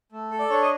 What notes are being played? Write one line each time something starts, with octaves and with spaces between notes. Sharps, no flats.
A3
A4
D5
D4 C#5
D#5